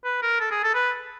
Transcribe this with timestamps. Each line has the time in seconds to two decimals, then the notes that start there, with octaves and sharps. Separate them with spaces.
0.05 B4
0.22 A#4
0.40 A4
0.51 G#4
0.64 A4
0.75 B4